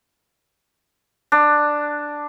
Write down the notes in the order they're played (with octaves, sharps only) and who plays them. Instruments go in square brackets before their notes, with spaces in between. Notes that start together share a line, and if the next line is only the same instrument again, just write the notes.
[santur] D4